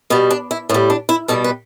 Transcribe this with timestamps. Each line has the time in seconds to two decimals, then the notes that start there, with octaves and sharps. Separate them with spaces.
0.10 B2 G3 B3
0.31 D4
0.51 E4
0.69 A2 B3
0.74 G3
0.90 D4
1.09 E4
1.28 B2 G3 A4
1.44 B4